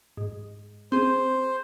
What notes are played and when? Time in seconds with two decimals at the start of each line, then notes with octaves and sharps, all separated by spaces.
0.17 G#2
0.92 C4 G#4 C5